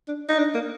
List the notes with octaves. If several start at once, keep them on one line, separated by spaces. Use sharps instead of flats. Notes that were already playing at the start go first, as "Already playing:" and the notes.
D4
D#4
D4
A#3